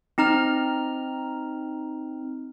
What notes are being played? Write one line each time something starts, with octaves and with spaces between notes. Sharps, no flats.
C4 D#4 A#5 F6